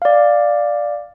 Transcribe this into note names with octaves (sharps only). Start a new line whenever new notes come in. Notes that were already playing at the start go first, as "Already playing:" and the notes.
D5 F5